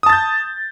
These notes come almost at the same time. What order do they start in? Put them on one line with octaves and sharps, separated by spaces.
D#6 A5 A6 G6